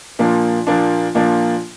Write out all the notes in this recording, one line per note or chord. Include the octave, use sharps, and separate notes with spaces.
A#2 F3 A#3 D4
A#2 F3 A#3 D4
A#2 F3 A#3 D4